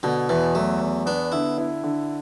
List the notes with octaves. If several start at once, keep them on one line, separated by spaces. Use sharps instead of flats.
B2 D3
E2 E3
F#3 A3
E2
B3 D4
D3 E4
E4
D3